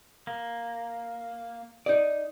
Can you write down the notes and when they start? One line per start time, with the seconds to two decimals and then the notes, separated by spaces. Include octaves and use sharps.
0.27 A#3
1.86 D#4 D5